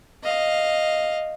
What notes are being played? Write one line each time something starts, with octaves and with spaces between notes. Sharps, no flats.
D#5 F5